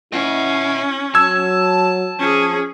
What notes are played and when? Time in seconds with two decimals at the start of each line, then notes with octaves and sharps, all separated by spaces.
0.13 C#4 E4 D#5 F#5
1.15 F#3 A5 E6 G#6
2.19 F3 C#4 G#4